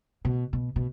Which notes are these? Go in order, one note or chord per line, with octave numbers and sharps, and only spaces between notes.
B2
B2
B2